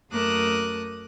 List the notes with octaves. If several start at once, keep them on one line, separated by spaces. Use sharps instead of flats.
F#2 A3 A#4 D6 D#6 F#6